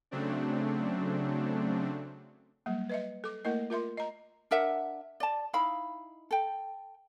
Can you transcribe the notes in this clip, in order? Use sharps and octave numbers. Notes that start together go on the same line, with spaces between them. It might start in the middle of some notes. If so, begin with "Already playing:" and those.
C#3 F#3 A3 C4 D4
F#3 G3 A#3
B4 D#5 E5
A4 D6
A3 A#3 E4 A#4 D#5
F4 A#4 E5 C6
D#5 A#5
D4 A#4 E5 F#5
D5 A5
D#4 E4 F5 B5
A4 G5